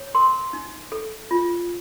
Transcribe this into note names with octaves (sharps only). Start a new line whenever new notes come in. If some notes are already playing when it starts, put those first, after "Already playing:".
Already playing: C#5
A#4 C6
D#4
A4
F4